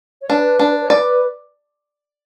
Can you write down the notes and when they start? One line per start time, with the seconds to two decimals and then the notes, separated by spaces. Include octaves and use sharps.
0.21 C#5
0.30 D4 B4
0.59 D4
0.75 B4
0.83 C#5
0.90 B4 D5